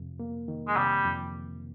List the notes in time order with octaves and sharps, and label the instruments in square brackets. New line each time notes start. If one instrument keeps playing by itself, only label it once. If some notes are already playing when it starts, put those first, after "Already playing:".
Already playing: [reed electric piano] F2 C3
A#3
D#3
[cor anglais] G#3
[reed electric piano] C3 [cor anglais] G3
[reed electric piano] F2